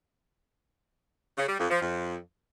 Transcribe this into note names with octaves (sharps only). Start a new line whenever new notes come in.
C#3
G3
F2
F3
F2